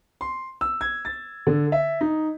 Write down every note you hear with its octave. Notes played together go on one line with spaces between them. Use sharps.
C6
E6
G#6
A6
D3
E5
D#4